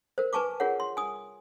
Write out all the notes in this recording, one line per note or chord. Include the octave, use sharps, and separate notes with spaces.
A#4 C5
B4 G#5 A5 C#6 D6
F4 G#4 A#4 C#5 F#5
C6
G#5 D#6